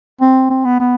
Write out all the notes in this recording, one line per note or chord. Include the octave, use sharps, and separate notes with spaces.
C4
C4
B3
B3